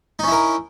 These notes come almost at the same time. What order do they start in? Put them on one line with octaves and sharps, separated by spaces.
D#4 C#4 E4 A#4